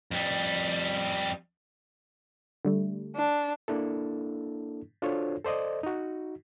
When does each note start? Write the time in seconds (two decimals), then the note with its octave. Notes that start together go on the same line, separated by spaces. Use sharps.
0.11 F2 G3
2.65 D3 G3 A3
3.16 D4
3.68 A#3 D4 E4 A4
5.02 D4 F4 F#4 A4 C5 C#5
5.45 A4 C5 D5 D#5
5.83 D#4 F#4